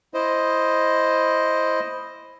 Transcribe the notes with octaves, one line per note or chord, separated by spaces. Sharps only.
E4 C5 D#5